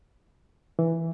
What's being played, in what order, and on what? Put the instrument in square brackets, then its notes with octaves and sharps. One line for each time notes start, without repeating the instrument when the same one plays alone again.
[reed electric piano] E3